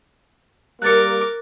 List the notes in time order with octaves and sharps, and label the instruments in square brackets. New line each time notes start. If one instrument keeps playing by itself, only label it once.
[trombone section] G3 A#3 [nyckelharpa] A#4 D6 [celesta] F#6 A6 C#7